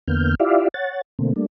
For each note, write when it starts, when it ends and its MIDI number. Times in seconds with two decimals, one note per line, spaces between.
0.08 0.35 40
0.08 0.35 50
0.08 0.35 58
0.08 0.35 59
0.08 0.35 89
0.08 0.35 91
0.40 0.68 64
0.40 0.68 65
0.40 0.68 67
0.40 0.68 74
0.40 0.68 76
0.40 0.68 77
0.74 1.01 73
0.74 1.01 78
0.74 1.01 93
1.19 1.33 47
1.19 1.33 50
1.19 1.33 57
1.19 1.33 58
1.19 1.33 60
1.36 1.46 55
1.36 1.46 57
1.36 1.46 58
1.36 1.46 62